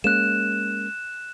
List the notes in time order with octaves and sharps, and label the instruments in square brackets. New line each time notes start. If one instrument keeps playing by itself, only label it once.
[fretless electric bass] G#3 A#3 C#4 [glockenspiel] F#6 E7